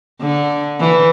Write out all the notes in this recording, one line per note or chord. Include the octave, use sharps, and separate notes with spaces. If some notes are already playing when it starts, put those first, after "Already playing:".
D3
E3